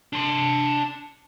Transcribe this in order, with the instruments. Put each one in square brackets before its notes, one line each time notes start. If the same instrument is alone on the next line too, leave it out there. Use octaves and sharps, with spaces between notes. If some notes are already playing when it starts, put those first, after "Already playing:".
[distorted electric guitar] D4 C6